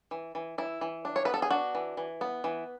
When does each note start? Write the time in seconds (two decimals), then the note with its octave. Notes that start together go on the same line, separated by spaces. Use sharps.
0.11 E3
0.35 E3
0.58 E3 E4
0.81 E3
1.05 D4
1.16 C#5
1.25 B3 B4
1.34 A4
1.42 G#4
1.50 D4 F#4
1.75 E3
1.97 E3
2.21 B3
2.44 E3